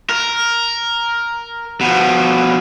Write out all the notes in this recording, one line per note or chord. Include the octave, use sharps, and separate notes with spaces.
A#4
B2 F3